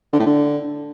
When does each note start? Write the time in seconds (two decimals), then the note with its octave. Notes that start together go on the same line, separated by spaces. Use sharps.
0.13 D3
0.19 A2
0.26 D3